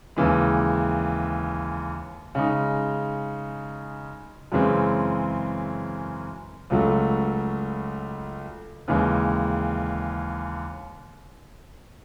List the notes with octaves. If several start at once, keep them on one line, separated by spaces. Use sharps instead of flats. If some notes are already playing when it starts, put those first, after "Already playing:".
D#2 C#3 E3 G#3
C#3 G#3 D#4
F#2 C#3 E3 G#3 C4
C#2 C#3 F#3 A3
D#2 C#3 E3 G#3